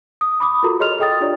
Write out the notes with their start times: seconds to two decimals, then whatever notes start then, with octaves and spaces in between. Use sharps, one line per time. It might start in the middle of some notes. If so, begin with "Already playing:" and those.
0.21 D#6
0.40 B5 D6 D#6
0.63 F4 F#4 A4 A#4 A#5
0.79 G#4 C#5 D#5 C6 F6 F7
0.98 G#4 A4 D#5 G5 D#6 A6
1.21 D4 F4 G4 C#5 D5